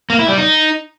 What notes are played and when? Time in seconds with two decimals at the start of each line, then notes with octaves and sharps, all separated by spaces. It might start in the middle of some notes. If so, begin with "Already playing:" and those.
0.10 A#3
0.19 E4
0.28 G3
0.38 D#4